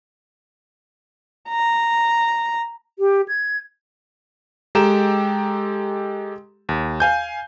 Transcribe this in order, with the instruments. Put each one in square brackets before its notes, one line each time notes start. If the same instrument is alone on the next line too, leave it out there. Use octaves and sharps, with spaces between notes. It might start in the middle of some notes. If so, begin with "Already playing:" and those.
[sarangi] A#5
[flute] G4
G#6
[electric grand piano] G#3 G4 A4 G5 A#5 E7
D#2
F5 G#5 G6